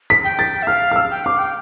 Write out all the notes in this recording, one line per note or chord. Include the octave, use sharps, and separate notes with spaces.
B6
G5
A6
E5
F5 F6
F6
E6
G5
F5 D6
G5